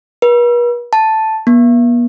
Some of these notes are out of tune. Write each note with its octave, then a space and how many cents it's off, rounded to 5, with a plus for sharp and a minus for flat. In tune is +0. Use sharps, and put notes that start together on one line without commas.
B4 -45
A5 +0
B3 -45